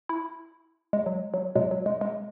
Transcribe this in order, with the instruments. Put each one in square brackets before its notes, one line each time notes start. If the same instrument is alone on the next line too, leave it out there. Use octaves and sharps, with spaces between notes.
[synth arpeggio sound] E4
G#3
F#3
F#3
B2 F#3 G#3
F#3
G#3
G#3